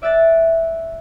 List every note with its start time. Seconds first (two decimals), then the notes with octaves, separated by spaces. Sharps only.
0.02 D5 E5 F#6 A6